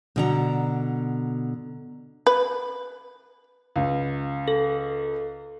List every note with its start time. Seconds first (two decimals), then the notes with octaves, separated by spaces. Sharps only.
0.16 B2 D3 A#5
2.27 B4
3.76 C#2
4.48 A4